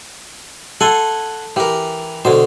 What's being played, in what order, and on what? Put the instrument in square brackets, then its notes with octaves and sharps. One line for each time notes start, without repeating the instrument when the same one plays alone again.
[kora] A4 [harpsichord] F#5 G#5 C6
[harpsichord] E3 A#4 [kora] G4
[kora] B2 [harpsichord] D3 C5